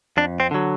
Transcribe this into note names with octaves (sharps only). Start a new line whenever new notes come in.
F2 D4
C4
D3 F#3